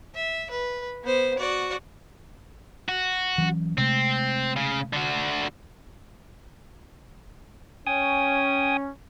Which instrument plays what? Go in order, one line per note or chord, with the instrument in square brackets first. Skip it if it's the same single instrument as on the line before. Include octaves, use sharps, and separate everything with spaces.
[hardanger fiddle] E5
B4
B3 C5
F#4 D5
[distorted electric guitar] F#4
[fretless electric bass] E3 F#3 C#4
[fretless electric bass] C3 G#3 A3 [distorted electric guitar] C4
[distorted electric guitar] C#3
D3 F#4
[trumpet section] C#4 [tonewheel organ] G5 G#5 D#6